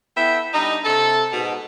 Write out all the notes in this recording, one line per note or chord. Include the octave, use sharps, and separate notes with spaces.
B3 E4 A4 E5 G5
G3 D4 D#4
C3 A4
G#2 B2